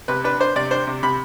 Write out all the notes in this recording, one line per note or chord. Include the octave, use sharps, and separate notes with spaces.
C3 B4
D4 B4
D4 C5
C3 D5
D4 C5
C3
C3 B5